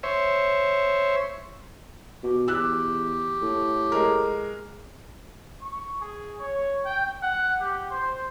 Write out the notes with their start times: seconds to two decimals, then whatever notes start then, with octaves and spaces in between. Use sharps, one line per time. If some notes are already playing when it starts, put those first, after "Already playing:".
0.03 C5 C#5 E5
2.23 B2 G4
2.48 E2 G4 E6 F#6
3.42 A2
3.92 G#3 A#4
5.62 C#6
6.00 G#4
6.39 C#5
6.86 G5
7.22 F#5
7.61 G4
7.91 C5